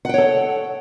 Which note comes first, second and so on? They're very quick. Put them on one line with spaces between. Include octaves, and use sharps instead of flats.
F#5 G5 C#5 A4